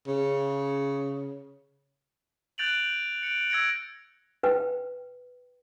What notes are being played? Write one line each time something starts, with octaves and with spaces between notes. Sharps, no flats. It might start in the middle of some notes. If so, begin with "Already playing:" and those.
C#3
F#6 G6 A6 D7 F7 F#7
C#7 D7
E6 G#6 A#6 C#7 D7
B4 G5